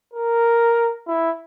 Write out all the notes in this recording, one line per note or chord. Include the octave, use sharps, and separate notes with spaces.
A#4
E4